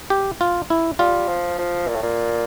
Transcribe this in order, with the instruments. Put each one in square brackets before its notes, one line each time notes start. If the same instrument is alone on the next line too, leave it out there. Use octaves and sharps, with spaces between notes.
[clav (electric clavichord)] G4
F4
E4
[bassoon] G3 [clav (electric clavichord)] F4
[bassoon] F3
F3
A#2
A2
A#2